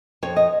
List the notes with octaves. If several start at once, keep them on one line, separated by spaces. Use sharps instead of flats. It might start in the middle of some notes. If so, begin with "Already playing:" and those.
F2 C#5
D#5